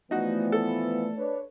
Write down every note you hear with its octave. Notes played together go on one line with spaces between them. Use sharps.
E3 F3 A3 B3 D#4 F#4 D5
A4
D4 B4 C#5